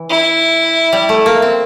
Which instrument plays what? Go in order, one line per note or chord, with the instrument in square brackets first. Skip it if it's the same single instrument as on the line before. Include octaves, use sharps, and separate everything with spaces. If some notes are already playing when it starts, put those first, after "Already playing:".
Already playing: [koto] E3
[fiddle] E4
[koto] G3
A3
A#3
C4